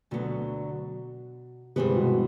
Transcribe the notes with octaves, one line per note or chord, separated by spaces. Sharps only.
D2 B2 D3 F#3 B3
G2 C3 E3 G#3 B3
B2